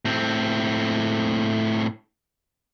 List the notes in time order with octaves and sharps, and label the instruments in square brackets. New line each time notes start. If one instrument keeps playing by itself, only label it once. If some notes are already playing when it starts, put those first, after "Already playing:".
[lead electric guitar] A2 C4